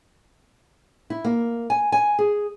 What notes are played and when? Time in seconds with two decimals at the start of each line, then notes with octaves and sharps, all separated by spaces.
1.10 E4
1.25 A#3
1.70 G#5
1.92 G#5
2.19 G#4